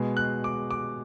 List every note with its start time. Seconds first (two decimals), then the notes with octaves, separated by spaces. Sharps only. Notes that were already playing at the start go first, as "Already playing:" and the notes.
Already playing: B2 G#3 B3
0.17 F#6
0.44 D6
0.71 D6